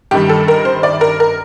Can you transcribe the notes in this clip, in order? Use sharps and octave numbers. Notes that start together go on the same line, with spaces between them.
G2 D#3 G3 G4
A4
A#4
C5
D5
A#4
A#4